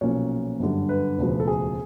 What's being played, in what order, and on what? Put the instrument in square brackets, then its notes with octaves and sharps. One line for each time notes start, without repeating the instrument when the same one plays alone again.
[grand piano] B1 A#2 F3 A#3 C#4 C#5
G1 F#2 D3 G3
B4
E1 D2 C#3 F3
A4
G#4